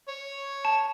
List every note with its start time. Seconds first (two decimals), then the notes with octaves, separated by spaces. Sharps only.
0.08 C#5
0.65 A5